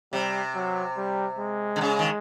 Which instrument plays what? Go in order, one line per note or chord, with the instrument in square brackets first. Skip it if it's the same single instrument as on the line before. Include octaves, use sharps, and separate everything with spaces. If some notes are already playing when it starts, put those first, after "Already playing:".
[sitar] C3 [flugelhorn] G3
[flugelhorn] F#3
G3
G#3
[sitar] D3
C#3
D#3